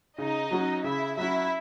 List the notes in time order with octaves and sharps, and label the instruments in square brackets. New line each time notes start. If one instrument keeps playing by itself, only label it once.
[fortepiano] C#3 [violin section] D#4 D#5
[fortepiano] F#3 C#4 F#4
[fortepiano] C#3 [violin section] E4 E5
[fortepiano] F#3 C#4 F#4 [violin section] E4 E5